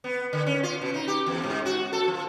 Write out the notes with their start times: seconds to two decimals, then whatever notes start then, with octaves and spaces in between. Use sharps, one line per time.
0.04 B3
0.33 D3
0.46 C#4
0.63 F4
0.81 B2
0.94 D#4
1.08 G4
1.26 E2
1.43 G#2
1.66 F#4
1.93 A4
2.08 F3